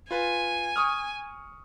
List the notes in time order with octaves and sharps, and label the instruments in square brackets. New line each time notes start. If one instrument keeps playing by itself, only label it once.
[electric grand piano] F4 B4 [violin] G#5
[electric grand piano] C#6 D#6 F6